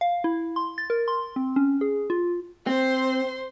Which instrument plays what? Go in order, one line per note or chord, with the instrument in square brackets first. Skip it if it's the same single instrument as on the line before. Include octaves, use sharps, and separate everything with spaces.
[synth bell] F5
E4
C6
A6
A#4
C6
C4
C#4
G#4
F4
[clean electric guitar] C4 [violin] C5 C6